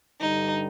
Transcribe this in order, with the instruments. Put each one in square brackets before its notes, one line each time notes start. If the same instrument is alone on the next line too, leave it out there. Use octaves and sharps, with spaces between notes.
[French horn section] G2 D3 G3 [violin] D#4